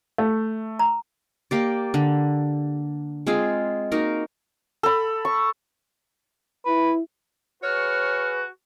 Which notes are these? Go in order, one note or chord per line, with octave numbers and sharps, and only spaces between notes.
A3
A#5
A#3 G4 D5
D3
G#3 C4 F4 G#4
A#3 D#4 F#4 A#4
A4 B5
C#6
E4 B4
F#4 G#4 B4 C#5 F6